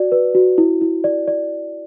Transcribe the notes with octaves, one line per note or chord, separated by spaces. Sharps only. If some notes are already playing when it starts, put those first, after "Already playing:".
Already playing: F#4 D5
B4
F#4
E4
E4
D5
D5